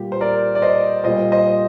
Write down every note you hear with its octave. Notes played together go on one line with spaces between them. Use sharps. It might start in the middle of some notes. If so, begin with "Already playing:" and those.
Already playing: A#2 G3 G4
C5
A#4 D5
D5
C5 D#5
A#2 G3 C5 D#5
C5 D#5